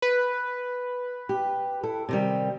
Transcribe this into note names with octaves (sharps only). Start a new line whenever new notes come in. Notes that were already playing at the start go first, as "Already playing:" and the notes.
B4
G4
E4 A4
C3 D#3 G3